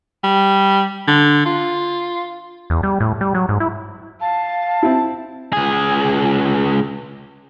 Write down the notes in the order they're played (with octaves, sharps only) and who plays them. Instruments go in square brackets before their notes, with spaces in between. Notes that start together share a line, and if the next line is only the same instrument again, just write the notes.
[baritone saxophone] G3
D3
F4
[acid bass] E2
G3
A2
G3
F#3
G#2
E4
[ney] F5 [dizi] A5
[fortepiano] C4 E4
[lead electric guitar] C#2 G#4